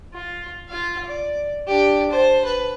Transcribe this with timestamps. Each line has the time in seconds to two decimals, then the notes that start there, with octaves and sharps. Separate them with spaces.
0.14 F4
0.69 F4 F5
1.05 D5
1.67 D4 G4
2.11 C5 A5
2.44 B4